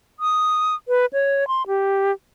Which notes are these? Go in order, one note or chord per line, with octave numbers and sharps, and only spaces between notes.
D#6
B4
C#5
C6
G4